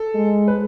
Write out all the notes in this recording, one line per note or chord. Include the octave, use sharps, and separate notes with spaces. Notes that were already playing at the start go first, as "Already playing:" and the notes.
Already playing: A4
G#3
B4